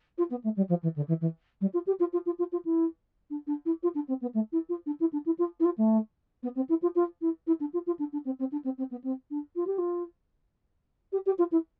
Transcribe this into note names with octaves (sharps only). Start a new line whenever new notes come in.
F4
B3
A3
G3
F3
E3
D3
E3
E3
G3
F4
G4
F4
F4
F4
F4
F4
E4
D4
D4
E4
F4
D4
C4
B3
A3
E4
F4
D4
E4
D4
E4
F4
E4
F4
A3
B3
C4
E4
F4
F4
E4
E4
D4
F4
F4
D4
D4
C4
C4
D4
C4
C4
B3
C4
D4
F4
G4
F4
G4
G4
F4
E4